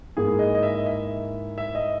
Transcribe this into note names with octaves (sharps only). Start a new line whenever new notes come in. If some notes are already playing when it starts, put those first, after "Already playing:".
G#2 E3 A#3 G#4
D#5
D#5
E5
D#5
E5
E5
D#5